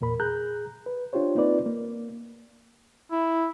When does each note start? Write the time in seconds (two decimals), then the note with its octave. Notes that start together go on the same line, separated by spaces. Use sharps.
0.01 E2 A#2 A#4 B5
0.20 G#4 A#5 F#6 G6
0.86 B4
1.13 D4 F4 G4 C5 C#5
1.35 A#3 C4 D#4 F4 B4 D5
1.66 A#3
3.12 E4